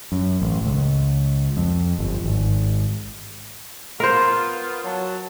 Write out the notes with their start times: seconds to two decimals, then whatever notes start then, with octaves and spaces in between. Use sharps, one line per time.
0.12 F#2
0.42 A1
0.66 C#2
1.57 F2
1.99 G1
2.24 G#1
4.00 B3 F4 A#4 C5
4.85 F#3 A5